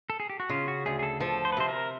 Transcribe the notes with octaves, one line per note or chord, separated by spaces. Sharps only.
A4
G#4
G4
F#4
C#3 F4
F#4
D2 G#4
G#4
A4
F3 A4
C5
B4
C3 C5
A#4